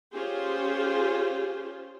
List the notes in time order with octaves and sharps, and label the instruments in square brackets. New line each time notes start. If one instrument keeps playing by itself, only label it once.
[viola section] C#4 F4 G4 G#4 C5